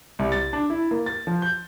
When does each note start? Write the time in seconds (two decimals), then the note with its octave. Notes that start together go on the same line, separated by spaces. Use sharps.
0.19 C2
0.32 A6
0.53 D4
0.70 E4
0.91 A#3
1.06 A6
1.27 F3
1.42 G6